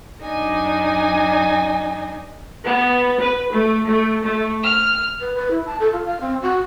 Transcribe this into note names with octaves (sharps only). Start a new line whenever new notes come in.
F#2 D4 D#4 G#5 A#6
B3
B4
A3
A3
A3
F6
B4
B4
E4
A5
A4
F4
F5
C4
F#4